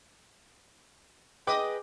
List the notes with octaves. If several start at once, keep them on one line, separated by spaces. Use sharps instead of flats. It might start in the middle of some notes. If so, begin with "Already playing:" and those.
G#4 B4 D#5 G5 D6